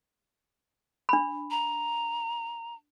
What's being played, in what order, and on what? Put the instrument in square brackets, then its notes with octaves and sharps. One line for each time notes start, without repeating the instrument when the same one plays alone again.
[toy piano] D4 B5
[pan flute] A#5